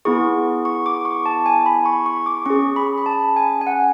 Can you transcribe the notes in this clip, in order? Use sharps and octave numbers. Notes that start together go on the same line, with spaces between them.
B3 E4 G#4 C#6
C#6
D6
C#6
A5
G#5
B5
C#6
C#6
D6
C#4 G#4 C#6
B5
B5
A5
G#5
G#5
F#5